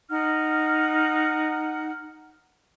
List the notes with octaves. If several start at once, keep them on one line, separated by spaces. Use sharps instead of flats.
D#4 F#5 F6